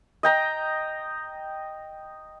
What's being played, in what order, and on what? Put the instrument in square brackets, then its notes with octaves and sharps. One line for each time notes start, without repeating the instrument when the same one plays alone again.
[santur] D#5 G5 A#5